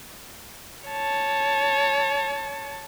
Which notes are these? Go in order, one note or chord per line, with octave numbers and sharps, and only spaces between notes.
C#5 A5